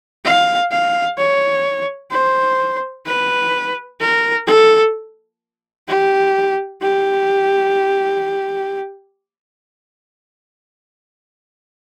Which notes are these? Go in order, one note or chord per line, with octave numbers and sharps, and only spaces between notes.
F5
F5
C#5
C5
B4
A#4
A4
G4
G4